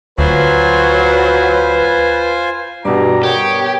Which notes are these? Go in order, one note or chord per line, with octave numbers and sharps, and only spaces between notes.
D2 F#3 F4 B4 C5 G#5
G2 B2 E3 G3 A#5
G2 B3 G4 A#4 C#5